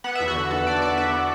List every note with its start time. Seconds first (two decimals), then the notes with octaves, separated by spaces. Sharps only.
0.04 B3 F#5
0.15 E2 E5
0.28 F#4
0.35 D3
0.50 E2 A4
0.66 E2 D5
0.82 E2 D5
0.98 E2 E5
1.13 B3